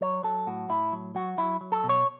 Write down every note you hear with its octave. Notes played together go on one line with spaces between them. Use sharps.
F#3 C#5
F#3 A4
A2 F#4
A2 E4
F#3
F#3 F#4
F#3 E4
F#3
A4
B2
C#5